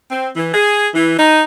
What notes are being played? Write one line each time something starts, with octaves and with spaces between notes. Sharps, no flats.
C4
E3
G#4
E3
D#4